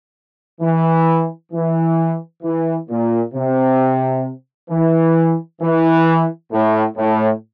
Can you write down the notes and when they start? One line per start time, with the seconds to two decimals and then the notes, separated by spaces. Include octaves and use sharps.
0.61 E3
1.52 E3
2.43 E3
2.89 A#2
3.34 C3
4.71 E3
5.62 E3
6.52 A2
6.97 A2